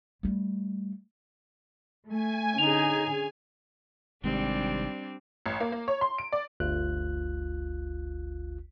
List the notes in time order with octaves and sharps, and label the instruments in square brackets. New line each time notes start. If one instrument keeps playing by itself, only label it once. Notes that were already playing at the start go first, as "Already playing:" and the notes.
[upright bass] G3 A3
[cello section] A3 [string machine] G#5
[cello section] D3 C#4 G#4 [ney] D#4 [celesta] F7
[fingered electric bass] G#1 G#2 C3 [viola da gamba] G3 C4 D4
[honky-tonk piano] A1
A#3
A#3
C#5
C6
D7
D5
[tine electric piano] G1 D2 F4 F#6